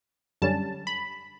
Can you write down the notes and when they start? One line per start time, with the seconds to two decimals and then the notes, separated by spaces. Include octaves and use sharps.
0.42 F#2 D3 G3 C#4 A5
0.87 B5